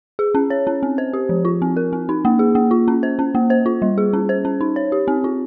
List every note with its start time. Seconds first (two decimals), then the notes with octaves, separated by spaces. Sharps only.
0.19 G#4
0.35 C#4
0.50 C#5
0.67 C#4
0.83 C4
0.98 C5
1.13 G4
1.29 F3
1.45 F4
1.62 C4
1.77 A#4
1.93 C4
2.09 D#4
2.25 A#3
2.39 G#4
2.55 A#3
2.71 F4
2.88 C#4
3.03 C5
3.19 C#4
3.35 A#3
3.50 C5
3.66 F4
3.82 G3
3.98 G#4
4.13 C#4
4.29 C5
4.45 C#4
4.61 D#4
4.76 C#5
4.92 G4
5.08 C4
5.24 F4